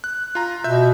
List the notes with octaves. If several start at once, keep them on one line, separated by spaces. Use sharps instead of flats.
F#6
F4 A#5
B2 E5 G6